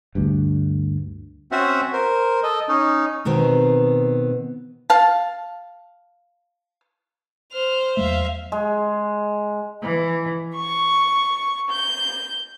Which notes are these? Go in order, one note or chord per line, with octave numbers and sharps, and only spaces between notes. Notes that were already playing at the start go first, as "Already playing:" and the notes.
D2 G2
C4 C#4 F#4 C5 E5 F#5
A#4 C5
A4 D#5
C#4 D#4
B2 D#3 B3 C4
F5 A5
C5 F6
E2 F#3 A3 E5 F5
G#3
E3
C#6
G6